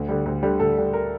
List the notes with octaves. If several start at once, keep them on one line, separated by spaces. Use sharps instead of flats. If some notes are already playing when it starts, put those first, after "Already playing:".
Already playing: D2
D3 G3
D2
D3 G3
D2 A4
D3 G3
A#4